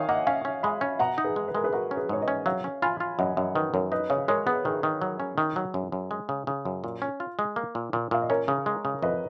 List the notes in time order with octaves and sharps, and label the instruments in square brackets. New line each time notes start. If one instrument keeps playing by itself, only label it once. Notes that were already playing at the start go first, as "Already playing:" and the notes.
Already playing: [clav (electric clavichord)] D#3 [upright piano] C#5 F5 G#5
[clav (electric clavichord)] A#3 [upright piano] D#5 F#5
[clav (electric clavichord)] C#4 [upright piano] F5 G#5
[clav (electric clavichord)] C#4
[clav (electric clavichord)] G#3 [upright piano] G#5 B5
[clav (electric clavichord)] C#4
[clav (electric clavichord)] B2 [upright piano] F#5 A#5
[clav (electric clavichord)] D#4
[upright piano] G#4 B4
[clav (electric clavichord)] G#3
[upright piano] B4
[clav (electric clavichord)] G#3 [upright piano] A#4
[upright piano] G#4 B4
[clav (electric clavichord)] G#3 [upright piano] F#4 A#4
[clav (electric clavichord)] C#4
[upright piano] G#4 B4
[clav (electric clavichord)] G#2 [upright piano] C#5
[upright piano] B4 D#5
[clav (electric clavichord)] C#4
[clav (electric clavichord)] F#3 [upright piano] C#5 F5
[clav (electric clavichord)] C#4
[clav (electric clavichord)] F4 [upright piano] G#5 B5
[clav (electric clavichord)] F4
[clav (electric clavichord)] F#2 [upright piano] D#5 F#5
[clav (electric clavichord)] F#2 [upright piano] D#5 F#5
[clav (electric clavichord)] D#3 [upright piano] B4 D#5
[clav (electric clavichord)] F#2 [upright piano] A#4 C#5
[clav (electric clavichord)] D#4 [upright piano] B4 D#5
[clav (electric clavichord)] C#3 [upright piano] C#5 F5
[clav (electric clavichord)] G#3 [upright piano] A#4 C#5
[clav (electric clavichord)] B3 [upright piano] G#4 B4
[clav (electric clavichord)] D#3 [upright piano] G#4 B4
[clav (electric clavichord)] D#3
F#3
C#4
D#3
F#3
F#2
F#2
G#3
C#3
C#3
F#2
A#2
C#4
F4
G#3
A#3
A#2
A#2
[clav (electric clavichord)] A#2 [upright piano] F5
[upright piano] D#5
[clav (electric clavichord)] C#4 [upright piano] A#4 C#5
[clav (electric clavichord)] C#3
G#3
C#3
[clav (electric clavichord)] F2 [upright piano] B4 D#5